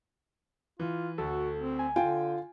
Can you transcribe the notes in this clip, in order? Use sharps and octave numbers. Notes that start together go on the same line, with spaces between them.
E3 F4
D2 F#4 A4
C4
G#5
D3 F4 G5 G#5